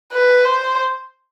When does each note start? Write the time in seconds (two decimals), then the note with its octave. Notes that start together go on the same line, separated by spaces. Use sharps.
0.13 B4
0.45 C5